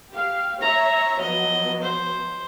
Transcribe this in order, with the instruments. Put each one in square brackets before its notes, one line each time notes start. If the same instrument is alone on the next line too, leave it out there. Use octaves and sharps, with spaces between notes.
[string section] G4 F5
[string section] C#5 E5 [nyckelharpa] A#5
[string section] F3 F#3 B3 [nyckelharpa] D#5
[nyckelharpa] C5